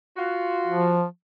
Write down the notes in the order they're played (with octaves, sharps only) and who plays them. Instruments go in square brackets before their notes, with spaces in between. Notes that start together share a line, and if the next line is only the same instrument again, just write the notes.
[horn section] F4 F#4
[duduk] F3